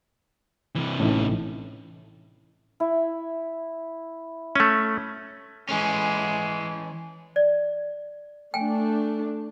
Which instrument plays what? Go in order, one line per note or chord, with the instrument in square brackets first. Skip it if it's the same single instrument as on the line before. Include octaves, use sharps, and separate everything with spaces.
[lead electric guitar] C3 E3
[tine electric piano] A1 A2 [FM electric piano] C#4 D#4
[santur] E4
[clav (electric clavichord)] A3 C#4
[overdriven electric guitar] E3 C#4 [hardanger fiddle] G#3
[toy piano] D5
[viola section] A3 D4 [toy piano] G5 G#5